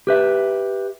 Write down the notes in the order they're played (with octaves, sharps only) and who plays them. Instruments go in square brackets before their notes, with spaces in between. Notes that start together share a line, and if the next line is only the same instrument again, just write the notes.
[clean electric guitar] G4 B4 E5